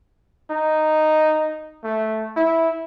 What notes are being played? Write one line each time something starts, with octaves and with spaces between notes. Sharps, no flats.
D#4
A3
E4